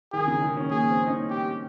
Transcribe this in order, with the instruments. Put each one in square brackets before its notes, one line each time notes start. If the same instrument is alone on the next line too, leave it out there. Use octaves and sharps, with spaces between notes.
[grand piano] D#3 [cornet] G#4
[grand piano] C#3
D#3
C#4
[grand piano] A#3 [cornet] G#4
[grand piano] C4
D#4
C#4
[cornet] G4